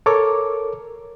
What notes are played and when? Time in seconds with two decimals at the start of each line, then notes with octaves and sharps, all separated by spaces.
0.06 A4 A#4 C#5 D6